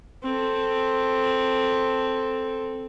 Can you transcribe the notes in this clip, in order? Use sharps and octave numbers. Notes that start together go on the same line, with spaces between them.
C4 A4